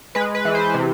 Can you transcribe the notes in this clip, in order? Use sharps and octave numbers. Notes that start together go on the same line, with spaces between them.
G#3 B4
B4
E3
C5
C3